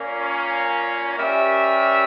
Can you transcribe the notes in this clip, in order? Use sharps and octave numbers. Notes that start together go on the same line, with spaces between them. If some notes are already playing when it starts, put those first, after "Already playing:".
Already playing: A#2 A#3 C#4
G3 C#4 G4 A#4 E5